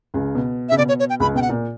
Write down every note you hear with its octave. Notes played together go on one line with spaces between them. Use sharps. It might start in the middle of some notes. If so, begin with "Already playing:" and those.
C#2 C#3
B2
C#3 E5
B2 D5
C#5
C#5
G5
C#2 C#3 B5
B2 G5
F#5
A#2